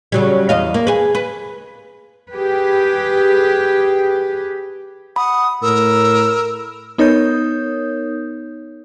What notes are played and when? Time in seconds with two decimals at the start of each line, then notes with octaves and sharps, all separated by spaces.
0.12 C#3 F#3 G3
0.49 E2 D#5 F5
0.74 A#3
0.87 G#4 B4
1.15 B4
2.32 G4 G#4 B4
5.16 F#5 B5 D#6
5.62 A2 A#4 E6
6.98 B3 D#4 A#4 C#5 D#6 G6